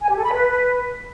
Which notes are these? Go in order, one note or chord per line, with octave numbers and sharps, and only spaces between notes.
G#5
G4
A4
B5
B4